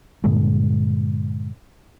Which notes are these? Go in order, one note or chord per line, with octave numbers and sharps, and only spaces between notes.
G2 A#2 D3 G#3